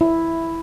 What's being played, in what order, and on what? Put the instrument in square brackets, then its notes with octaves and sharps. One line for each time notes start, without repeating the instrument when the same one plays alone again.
[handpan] E4